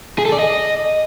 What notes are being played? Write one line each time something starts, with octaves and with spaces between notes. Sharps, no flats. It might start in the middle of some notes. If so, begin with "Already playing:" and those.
G#4
A4
D5
D#5